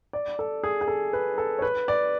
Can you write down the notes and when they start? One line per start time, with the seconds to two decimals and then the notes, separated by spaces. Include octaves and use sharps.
0.13 D5
0.39 A4
0.64 G#4
0.81 G#4
0.88 A4
1.13 B4
1.38 A4
1.59 C#5
1.62 B4
1.88 D5